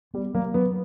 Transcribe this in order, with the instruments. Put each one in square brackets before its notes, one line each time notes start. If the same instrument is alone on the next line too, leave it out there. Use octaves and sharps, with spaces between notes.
[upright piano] G3 [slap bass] B3
[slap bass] F#3 [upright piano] A#3
[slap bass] F#3 [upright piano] B3